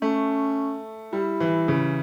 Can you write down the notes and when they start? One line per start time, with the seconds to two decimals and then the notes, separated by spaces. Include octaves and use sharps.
0.02 A3 C#4
1.13 G3 E4
1.40 E3
1.68 C#3